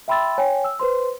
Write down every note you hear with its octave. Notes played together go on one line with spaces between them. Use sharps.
E5 G5 B5 C6 E6 A6
C#5 G5 G#5
E6
B4 C5 C6